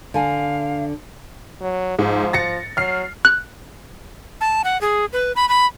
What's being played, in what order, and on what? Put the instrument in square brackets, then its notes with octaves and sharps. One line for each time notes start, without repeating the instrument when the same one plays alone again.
[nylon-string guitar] D3 G#5 [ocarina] F5
[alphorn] F#3
[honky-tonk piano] G#2 [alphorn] F3
[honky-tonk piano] A6 A#6 C#7
[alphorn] F#3 [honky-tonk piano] F6 C7
[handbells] F#6
[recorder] A5
F#5
G#4
B4
B5
B5